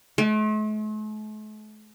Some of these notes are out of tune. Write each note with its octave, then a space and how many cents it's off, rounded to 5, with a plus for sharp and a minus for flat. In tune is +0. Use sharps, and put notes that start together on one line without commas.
A3 -45